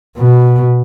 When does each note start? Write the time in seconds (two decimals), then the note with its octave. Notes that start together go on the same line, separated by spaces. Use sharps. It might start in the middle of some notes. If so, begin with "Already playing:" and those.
0.17 B2